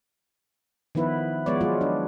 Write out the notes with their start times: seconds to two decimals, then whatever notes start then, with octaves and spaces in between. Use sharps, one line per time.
0.95 D#3 F3 B3 E4 B4
1.46 F3 G#3 B3 C#5 D5
1.61 F#3 G#3 F4
1.81 D4